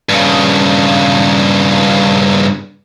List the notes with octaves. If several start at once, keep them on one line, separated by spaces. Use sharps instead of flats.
G2 C#3